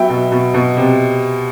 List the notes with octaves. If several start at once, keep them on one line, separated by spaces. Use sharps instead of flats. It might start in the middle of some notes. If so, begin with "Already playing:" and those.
Already playing: F#3 B3 E5 G5
B2
B2
B2
C3